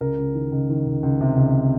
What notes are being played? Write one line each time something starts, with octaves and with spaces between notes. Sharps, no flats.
C#2 A#4
C#2
D#3
C#2
D#3
C#2
C#2
C3
C#2